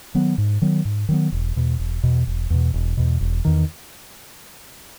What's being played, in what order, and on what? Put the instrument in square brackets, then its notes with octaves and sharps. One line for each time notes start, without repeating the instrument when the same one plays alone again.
[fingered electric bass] D#3 F#3 B3
G#2
D#3 F#3 B3
G#2
D#3 F#3 B3
E1
E2 B2
E1
E2 B2
E1
E2 B2
E1
E2 B2
E1
E2 D#3